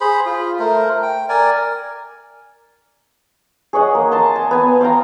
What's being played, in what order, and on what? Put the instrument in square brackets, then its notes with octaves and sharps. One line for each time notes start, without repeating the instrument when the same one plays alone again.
[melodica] G#4 C5 B5
F4
A3 A#4 C5
G5
A#4 D5 G#5
[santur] G#4 C#5 D#5 F#5
A#3
A5 A#5 C6
G#5
B3 G#5 A5
C5 F5 G5 A#5